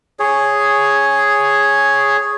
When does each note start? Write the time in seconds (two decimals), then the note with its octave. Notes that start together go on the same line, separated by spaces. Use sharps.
0.19 G#4 C#5